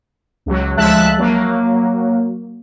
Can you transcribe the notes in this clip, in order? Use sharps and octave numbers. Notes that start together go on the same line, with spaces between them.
C#2 F#3
D2 F3 G#3 E5 A5 F#6
F#3 A#3